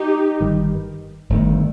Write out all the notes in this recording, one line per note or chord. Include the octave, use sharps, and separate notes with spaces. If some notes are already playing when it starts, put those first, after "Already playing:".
Already playing: D#4 G4
G1 G2 D#3
G1 G2 D#3 A3